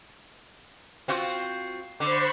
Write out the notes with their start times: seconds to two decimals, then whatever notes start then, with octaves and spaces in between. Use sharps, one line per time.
1.08 C4 F4 F#4
2.00 D3 C5 B5 C#6 D6